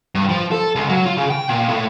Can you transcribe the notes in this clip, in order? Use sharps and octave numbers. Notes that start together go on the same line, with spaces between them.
G2
F3
A4
C#2
F#3
F4
C#3
G5
A#2
A2